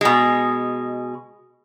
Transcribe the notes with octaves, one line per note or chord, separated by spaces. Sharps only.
B2 G#3